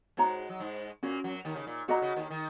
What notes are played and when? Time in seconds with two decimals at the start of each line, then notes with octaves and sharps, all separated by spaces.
0.17 G#2 G#3 F#4 C#5 A#5
0.49 F#3
0.60 G#2 G#3
1.03 A#2 A#3 C#4 F#4
1.24 F#2 F#3
1.45 D#2 D#3
1.56 C#3
1.67 A#2
1.88 A#2 F#4 D#5 A#5
2.02 C#3
2.16 D#2 D#3
2.30 D#3